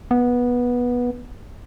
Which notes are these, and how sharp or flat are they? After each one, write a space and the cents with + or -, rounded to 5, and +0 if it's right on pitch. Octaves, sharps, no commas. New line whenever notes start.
B3 -15